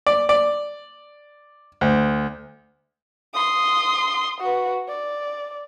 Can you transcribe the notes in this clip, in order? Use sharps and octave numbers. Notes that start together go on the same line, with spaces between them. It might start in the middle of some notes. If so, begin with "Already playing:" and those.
D5
D5
D2
C6 D#6
F#4 B4
D5